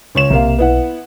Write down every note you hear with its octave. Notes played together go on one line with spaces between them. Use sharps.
C#2 C#5 E7
B1 C3 A#3 F5
B3 E4 F#5